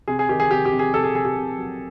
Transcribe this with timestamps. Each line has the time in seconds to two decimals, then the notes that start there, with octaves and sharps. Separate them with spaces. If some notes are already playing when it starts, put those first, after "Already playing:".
0.08 C3 G#4
0.19 G#4
0.29 D#3 G4
0.40 G#4
0.50 C3 G4
0.65 G4
0.72 C3
0.79 G#4
0.94 C3 A4
1.04 G#4
1.15 C3 G#4
1.25 G4
1.36 C3
1.58 F#3